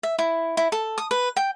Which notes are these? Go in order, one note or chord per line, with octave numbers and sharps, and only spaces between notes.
E5
E4
E4
A4
D#6
B4
G5